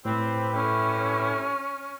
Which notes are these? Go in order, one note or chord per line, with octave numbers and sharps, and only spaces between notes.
A2 C4 G4 B4
G3 A3 C#4 E4 F6